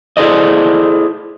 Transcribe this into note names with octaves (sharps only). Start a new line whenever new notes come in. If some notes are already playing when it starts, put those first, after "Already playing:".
E4 G#4 A4 C5 D5 D#5